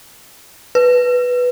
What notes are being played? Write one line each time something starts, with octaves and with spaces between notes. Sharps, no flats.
B4